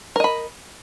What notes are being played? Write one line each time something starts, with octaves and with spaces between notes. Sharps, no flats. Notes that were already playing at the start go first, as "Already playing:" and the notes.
A#4 D#5 B5